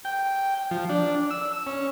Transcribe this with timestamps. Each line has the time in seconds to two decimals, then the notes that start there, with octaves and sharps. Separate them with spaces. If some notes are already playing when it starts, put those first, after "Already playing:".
0.05 G5
0.71 F3
0.89 D4
1.31 E6
1.67 C#4